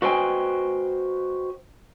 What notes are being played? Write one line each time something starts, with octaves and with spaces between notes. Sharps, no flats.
F#4 B4 C5 D#5 G5 G#5